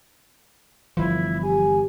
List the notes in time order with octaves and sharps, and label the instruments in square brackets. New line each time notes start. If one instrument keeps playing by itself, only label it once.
[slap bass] G1 E3 [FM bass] F3 [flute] E4
[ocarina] G4 [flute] G#5